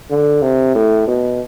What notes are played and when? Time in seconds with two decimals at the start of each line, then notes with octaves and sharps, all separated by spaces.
0.11 D3
0.42 C3
0.75 A2
1.08 B2